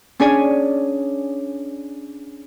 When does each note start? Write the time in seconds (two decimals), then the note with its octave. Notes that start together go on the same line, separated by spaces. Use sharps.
0.20 C#4 D4 G#4 C#5 D5 G#5